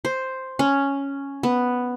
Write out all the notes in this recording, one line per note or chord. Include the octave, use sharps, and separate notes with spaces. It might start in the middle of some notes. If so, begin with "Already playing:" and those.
C5
C#4
B3